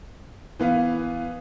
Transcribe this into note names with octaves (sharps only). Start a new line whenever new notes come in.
E3 B3 F5